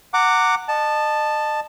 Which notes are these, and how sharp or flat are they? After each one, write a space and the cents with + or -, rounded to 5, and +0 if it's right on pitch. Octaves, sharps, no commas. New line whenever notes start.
F#5 +0 A#5 -25 D6 +0
D#5 -35 A5 +0